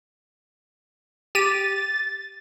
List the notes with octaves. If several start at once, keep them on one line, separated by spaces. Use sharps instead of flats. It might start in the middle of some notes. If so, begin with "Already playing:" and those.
G4 A6 D#7